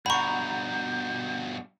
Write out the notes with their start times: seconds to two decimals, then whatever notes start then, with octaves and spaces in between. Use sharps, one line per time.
0.06 G2 B2 F#5 A#5 B5 C#6 G6